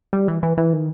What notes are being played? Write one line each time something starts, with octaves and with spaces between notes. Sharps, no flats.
G3
E3
E3
E3
D#3